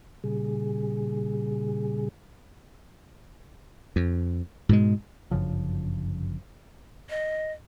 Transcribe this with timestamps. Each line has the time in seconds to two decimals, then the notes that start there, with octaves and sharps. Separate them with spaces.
0.24 A#2 C#3 G3 G#4
3.96 F2
4.69 G#2 B2 G#3
5.31 G1 F#2 C#3 F3
7.10 D#5